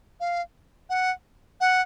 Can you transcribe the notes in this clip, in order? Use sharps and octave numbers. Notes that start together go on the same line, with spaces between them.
F5
F#5
F#5